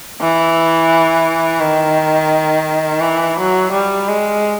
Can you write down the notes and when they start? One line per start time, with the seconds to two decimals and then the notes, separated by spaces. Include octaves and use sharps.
0.20 E3
1.60 D#3
3.01 E3
3.37 F#3
3.71 G3
4.08 G#3